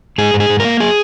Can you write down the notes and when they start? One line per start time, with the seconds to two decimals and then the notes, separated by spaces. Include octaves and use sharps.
0.18 G#2 G#4
0.34 G#2
0.40 G#4
0.50 G#2
0.60 A#3 A#4
0.80 G#4